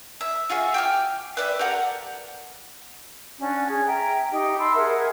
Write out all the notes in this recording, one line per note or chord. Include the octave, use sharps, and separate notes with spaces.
E5
F4 F#4 G#4 E5
G5 D6 F6
B4 D5 E5
G4 A4 A#4 F#5
C#4 D4 F#4 D5
C#4 G#4
E5 G5 A#5
D#4 G4 D#5
A5 B5 C6 E6
G#4 A#4 E5 F#5